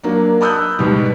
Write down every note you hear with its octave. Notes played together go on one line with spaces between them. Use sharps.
F#3 A#3 D4
A5 B5 D#6 E6 F#6 G6
G#2 B2 G3